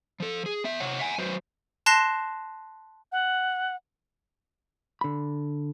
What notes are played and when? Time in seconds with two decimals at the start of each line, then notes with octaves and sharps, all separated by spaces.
0.20 F3 A4
0.46 G#4
0.64 B3 E5
0.80 C3 C#5 F#5
0.99 E5 F#5 G#5
1.18 F#3 F#4 B4 C5
1.86 A5 C6 F#6 A#6 C7 E7
3.12 F#5
5.01 D3 B5